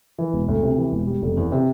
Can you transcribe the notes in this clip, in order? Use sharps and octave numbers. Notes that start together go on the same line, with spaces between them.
E3
E1
D2
C3
E3
E1
G3
F1
E2
C3